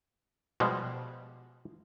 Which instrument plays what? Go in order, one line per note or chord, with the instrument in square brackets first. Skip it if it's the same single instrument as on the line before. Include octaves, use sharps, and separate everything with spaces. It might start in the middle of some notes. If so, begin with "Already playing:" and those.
[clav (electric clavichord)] B2 F3 G3 G#3